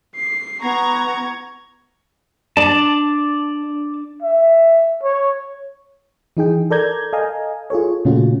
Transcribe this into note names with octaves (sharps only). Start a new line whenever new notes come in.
C7
B3 A#5 C#6 G#6
D4 D5 A5
E5
C#5
E3 D#4 G#4 G5
A4 A#4 D5 A#5 G6 G#6
A4 D#5 F5 G#5 A#5
F4 G#4 A4 C#5
A#2 C#3 A3 C#4 F4 F#4